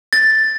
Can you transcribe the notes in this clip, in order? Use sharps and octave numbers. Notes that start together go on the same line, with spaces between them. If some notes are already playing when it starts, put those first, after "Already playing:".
A6